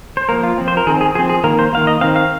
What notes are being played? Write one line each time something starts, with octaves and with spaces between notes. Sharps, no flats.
C5
F3 A#3 A#4
F4
F3 C4
C5
A#4
D#3 C4 G#4
G#4
F3 C4 G#4
G#4
D#3 A#3 A#4
C5
D#3 A#3 F5
D#5
D#3 C4 F5
F5